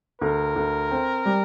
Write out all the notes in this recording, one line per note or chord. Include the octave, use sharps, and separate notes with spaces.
D2 A#4
D2
C4
G3